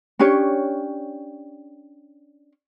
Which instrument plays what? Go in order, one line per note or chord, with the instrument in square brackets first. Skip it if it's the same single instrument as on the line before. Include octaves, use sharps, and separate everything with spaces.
[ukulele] C#4 D4 G4 C#5